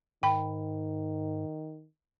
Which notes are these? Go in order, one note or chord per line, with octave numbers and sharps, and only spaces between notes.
G#2 D#3 G5 B5